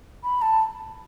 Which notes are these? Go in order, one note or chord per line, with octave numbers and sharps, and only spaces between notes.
B5
A5